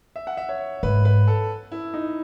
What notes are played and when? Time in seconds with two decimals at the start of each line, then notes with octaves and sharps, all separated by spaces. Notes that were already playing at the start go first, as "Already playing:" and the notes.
0.16 E5
0.27 F#5
0.37 E5
0.49 C#5
0.83 G#2 B4
1.05 B4
1.28 A4
1.72 E4
1.94 D#4